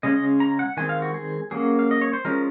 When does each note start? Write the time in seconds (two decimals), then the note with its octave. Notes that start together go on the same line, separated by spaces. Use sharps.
0.03 C#3 G#3 C#4 D#5
0.16 D#5
0.40 A#5
0.59 F#5
0.77 D#3 G#3 C4 G#5
0.89 F5
1.02 F#4
1.14 G#4
1.51 F#3 A#3 C#4 G#4
1.79 F5
1.91 D#5
2.01 C#5
2.13 C5
2.25 F3 G#3 C#4 A#4